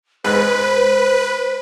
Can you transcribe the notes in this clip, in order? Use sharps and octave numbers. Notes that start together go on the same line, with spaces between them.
G#2 B4 C5 F#6